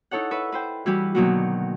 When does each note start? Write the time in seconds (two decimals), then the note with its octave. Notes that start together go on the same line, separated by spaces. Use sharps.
0.11 D#4 E4 A4 C#5 F#5
0.31 B4 E5 C#6
0.52 B4 C5 G5
0.86 E3 G3 E4 F#4 G4 B4
1.15 B2 D3 D#3 F#3 A#3 F#4